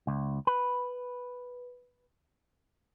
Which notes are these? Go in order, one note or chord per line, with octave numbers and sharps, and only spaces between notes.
C#2
B4